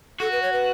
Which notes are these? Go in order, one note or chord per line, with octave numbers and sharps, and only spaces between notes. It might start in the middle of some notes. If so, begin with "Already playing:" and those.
F#4 A4
B4
C#5
B4